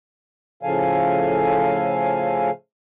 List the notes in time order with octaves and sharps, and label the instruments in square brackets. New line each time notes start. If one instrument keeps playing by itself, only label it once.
[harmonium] A2 C#3 F3 A4 F5 G#5